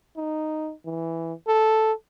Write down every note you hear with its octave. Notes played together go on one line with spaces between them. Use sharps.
D#4
E3
A4